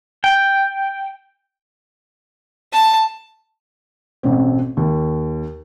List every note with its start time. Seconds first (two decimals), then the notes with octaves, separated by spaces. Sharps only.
0.24 G5
2.72 A5
4.23 A1 B2 C4
4.77 D#2